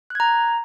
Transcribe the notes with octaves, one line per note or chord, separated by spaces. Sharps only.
A#5 F#6 G#6